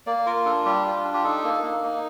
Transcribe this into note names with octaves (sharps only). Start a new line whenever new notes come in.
A#3 D5
F4 A#4
D4 A4
G3 G4
F4
D4
G4
D#4 A4
A#3
A#3
D#4